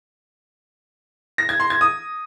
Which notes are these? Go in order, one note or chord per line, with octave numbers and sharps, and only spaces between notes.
A#6
G#6
C6
G#6
D#6